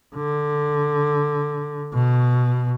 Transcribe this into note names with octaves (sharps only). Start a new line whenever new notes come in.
D3
B2